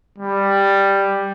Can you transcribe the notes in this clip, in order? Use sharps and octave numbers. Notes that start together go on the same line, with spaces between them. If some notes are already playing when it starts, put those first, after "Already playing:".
G3